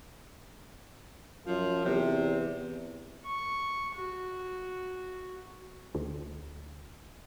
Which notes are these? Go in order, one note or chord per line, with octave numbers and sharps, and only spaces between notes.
F#2 F3
E2 C3
C#6
F#4
D2